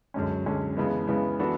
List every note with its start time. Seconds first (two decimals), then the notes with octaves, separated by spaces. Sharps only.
0.14 F#2 D3 G#3 C#4
0.46 F#2 D3 G#3 C#4
0.77 C#3 E3 G#3 B3
1.08 C#3 E3 G#3 B3
1.39 E3 B3 D4 F#4 A4